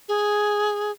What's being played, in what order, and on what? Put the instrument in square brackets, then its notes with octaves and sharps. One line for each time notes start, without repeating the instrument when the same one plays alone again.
[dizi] G#4